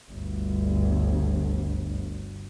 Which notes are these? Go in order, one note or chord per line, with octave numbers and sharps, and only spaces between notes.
G1 D2